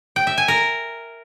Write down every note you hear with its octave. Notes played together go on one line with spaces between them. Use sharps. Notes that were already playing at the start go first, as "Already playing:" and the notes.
G5
E5
G#5
A#4